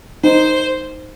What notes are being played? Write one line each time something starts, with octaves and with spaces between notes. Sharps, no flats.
D#4 C5